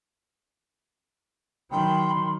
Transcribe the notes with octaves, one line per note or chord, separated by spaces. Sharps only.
D#3 F#3 G5 B5 C6